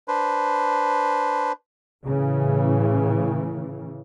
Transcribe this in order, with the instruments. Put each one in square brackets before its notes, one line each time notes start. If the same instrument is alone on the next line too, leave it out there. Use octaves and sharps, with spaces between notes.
[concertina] D4 B4 C5
[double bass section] A2 C#3 E3